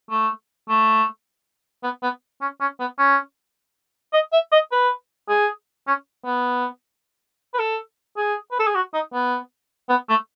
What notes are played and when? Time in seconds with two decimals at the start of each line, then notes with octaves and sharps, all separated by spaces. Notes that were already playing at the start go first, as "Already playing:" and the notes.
0.10 A3
0.69 A3
1.83 B3
2.03 B3
2.41 C#4
2.61 C#4
2.80 B3
2.98 C#4
4.13 D#5
4.33 E5
4.52 D#5
4.72 B4
5.29 G#4
5.87 C#4
6.25 B3
7.54 B4
7.59 A4
8.17 G#4
8.52 B4
8.59 A4
8.67 G#4
8.75 F#4
8.94 D#4
9.13 B3
9.89 B3
10.09 A3